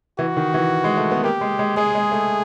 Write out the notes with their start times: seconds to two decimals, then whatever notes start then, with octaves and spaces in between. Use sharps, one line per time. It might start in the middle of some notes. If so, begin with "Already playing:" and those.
0.18 E3 F#4
0.37 D#3
0.54 E3
0.84 G#3
0.97 A3
1.11 B3
1.23 A#3 G4
1.41 G#3
1.59 G#3
1.77 G#3 G#4
1.95 G#3
2.12 A3